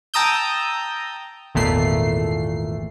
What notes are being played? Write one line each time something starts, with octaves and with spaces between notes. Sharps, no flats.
G5 A5 A#5 D#6 E6 G6
G#1 E2 A#2 A3 C7